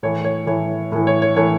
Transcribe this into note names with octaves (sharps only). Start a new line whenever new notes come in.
A2 E3 C#5
C#5
A2 E3 C#5
A2 E3
C#5
C#5
A2 E3 C#5